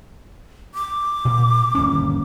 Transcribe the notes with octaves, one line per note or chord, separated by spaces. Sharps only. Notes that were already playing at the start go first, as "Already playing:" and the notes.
D6
A#2
G1 D#2 C#4